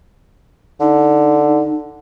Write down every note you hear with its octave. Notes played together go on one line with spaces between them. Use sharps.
D3 D#4